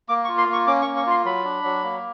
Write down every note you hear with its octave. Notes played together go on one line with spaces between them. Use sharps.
A#3 D6
C#6
F4
C6
A#3 C#6
C#4 D6
C#6
A#3
C#6
F4 C6
F#3 B5
D4
F#3
A#3